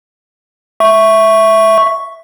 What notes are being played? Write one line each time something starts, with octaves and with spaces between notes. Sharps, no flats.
E5 C#6